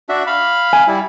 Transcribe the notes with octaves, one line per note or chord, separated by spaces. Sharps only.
D4 F#4 E5
F5 B5
G#5
G3 E4